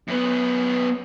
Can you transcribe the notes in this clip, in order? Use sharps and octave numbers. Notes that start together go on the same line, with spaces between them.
F#2 B3